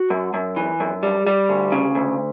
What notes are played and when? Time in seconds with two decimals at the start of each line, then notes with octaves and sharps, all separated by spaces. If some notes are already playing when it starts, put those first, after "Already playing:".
Already playing: F#4
0.10 F#2
0.34 F#2
0.56 E3
0.80 F#2
1.03 G3
1.27 G3
1.49 D2
1.72 C#3
1.95 D2